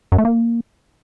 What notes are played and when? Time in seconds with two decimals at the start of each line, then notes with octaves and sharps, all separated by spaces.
0.12 F#2
0.18 A3
0.25 A#3